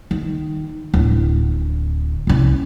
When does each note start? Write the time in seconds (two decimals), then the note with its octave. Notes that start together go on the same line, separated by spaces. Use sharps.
0.11 D#3
0.94 D1
2.27 C2 C#4